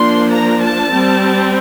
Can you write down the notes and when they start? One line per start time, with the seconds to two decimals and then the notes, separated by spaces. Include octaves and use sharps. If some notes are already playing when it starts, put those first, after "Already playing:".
Already playing: F3 A#3 D4 C6
0.34 A#5
0.63 A5
0.92 G3 C4